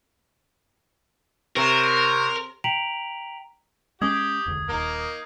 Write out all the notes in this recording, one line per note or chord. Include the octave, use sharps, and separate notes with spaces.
C3 A#4 C#5 A#5
G5 A#5 B6 D7 F7 F#7
G#3 C#4 G4 D#6 G#6
E1 C#2 D3
D#1 D#2 A#3 D#4 A#4